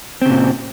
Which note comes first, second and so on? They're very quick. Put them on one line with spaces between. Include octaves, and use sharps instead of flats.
C4 C#3 A#2